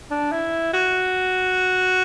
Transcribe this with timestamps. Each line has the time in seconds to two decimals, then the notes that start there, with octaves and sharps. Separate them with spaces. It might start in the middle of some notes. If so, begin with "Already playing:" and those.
0.11 D4
0.32 E4
0.73 F#4